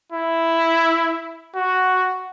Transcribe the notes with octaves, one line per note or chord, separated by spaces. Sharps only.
E4
F#4